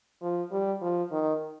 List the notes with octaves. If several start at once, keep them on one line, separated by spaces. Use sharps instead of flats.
F3
G3
F3
D#3